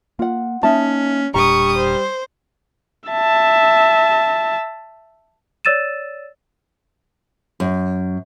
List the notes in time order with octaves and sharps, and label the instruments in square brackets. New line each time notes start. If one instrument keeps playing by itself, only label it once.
[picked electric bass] A#3 [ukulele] F4 F#5
[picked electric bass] A#3 [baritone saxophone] C#4 [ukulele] D#4 E5 A5
[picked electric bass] E1 A#2 D4 [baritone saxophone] G3 [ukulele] A#5 [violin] C#6 D#6
[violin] C5
[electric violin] E5 A5
[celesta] C#5 D5 E6 A6 D#7 E7
[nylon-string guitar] F#2